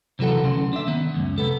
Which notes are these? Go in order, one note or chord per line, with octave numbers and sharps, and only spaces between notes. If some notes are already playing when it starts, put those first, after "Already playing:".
C3 E3 F#3 A4 F#5
D2 C#3 C6
D4 E5
D#3 B3
C#2 F#2
C3 B3 A4